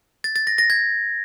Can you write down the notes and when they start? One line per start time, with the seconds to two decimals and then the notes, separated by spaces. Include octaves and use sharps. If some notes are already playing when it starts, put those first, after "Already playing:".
0.24 A6
0.36 A6
0.47 A#6
0.58 A#6
0.70 G#6